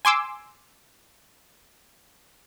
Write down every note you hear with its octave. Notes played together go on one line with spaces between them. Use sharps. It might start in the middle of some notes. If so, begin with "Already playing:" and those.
G#5 C6 D6 E6